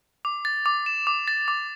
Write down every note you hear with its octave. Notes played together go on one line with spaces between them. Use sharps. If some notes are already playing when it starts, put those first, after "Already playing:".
D6
A6
D6
E7
D6
A6
D6